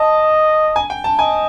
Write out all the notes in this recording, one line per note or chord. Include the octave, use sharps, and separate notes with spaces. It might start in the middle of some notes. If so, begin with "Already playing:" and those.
Already playing: D#5 A5
G#5
G5
A5
D#5 G#5